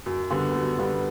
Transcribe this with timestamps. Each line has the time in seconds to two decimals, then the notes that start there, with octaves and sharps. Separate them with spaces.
0.06 F#2
0.31 D3 G3 B3
0.55 F#2
0.79 D3 G3 B3